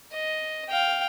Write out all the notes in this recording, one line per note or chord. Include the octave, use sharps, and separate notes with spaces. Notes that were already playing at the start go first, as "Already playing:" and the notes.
D#5
F5 G5